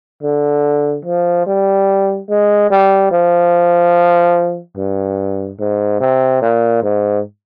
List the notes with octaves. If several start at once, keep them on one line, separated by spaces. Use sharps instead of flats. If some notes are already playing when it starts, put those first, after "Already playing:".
D3
F3
G3
G#3
G3
F3
G2
G#2
C3
A#2
G#2